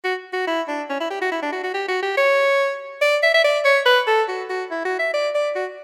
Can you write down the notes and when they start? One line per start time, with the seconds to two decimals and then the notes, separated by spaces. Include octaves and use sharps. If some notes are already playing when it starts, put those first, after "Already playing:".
0.05 F#4
0.33 F#4
0.47 E4
0.68 D4
0.90 C#4
1.00 E4
1.10 G4
1.21 F#4
1.32 E4
1.42 D4
1.53 F#4
1.64 F#4
1.74 G4
1.88 F#4
2.03 G4
2.17 C#5
3.02 D5
3.23 E5
3.34 E5
3.44 D5
3.65 C#5
3.86 B4
4.07 A4
4.29 F#4
4.50 F#4
4.71 E4
4.85 F#4
4.99 E5
5.14 D5
5.35 D5
5.56 F#4